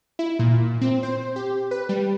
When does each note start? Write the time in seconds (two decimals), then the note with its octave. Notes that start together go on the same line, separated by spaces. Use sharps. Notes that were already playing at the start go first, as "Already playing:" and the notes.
0.19 E4
0.39 A#2
0.82 C4
1.03 C5
1.36 G4
1.71 B4
1.89 G3